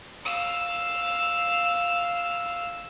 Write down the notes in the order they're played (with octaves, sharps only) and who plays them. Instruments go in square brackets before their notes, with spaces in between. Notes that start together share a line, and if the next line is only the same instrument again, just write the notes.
[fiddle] F5 E6